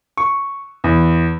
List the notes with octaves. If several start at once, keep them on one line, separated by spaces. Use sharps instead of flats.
C#6
E2